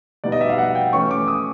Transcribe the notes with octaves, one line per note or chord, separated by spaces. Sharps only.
B2 G3 B3 D#4 D5
D#5
E5
F5
F#5
G5
E3 A3 C#4 C#6
D6
D#6